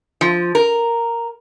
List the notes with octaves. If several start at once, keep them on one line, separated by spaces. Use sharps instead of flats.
F3
A#4